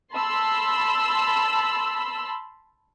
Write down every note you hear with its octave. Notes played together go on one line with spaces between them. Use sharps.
A5 B5 C6 E6